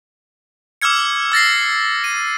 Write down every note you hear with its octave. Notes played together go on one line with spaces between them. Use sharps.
D6 E6 F6 G#6 C#7
E6 A6 A#6 C7
D#7